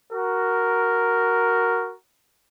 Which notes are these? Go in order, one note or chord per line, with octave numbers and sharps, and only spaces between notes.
F#4 A#4